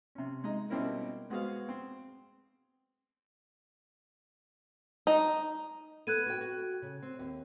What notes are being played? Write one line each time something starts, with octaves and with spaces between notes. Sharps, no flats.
C3 C#4
G#3 D#4 D#5 A#5
B2 G3 C4 C#4 E4 A#4
G#3 B3 F#4 G#4 C5 F5
C4
D#4
B3 A4 B4 F#6 G#6 D#7
F#4 G5
F#4
C#3
C4
D#2